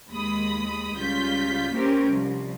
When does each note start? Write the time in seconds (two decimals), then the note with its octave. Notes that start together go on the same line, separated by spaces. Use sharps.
0.10 D#2 G#3 B5 D#6
0.96 C#2 C#3 G3 F4 G6 B6
1.73 A#3 C4 C#4 G4 A#4
2.07 C2 F3